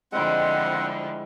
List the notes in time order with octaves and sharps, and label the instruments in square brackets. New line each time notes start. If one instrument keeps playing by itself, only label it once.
[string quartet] D3 F3 G3 [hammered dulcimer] G#3 E4 [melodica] C4 F#5